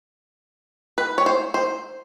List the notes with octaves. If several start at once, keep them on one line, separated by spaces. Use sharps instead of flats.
B4
C#5
C5
C5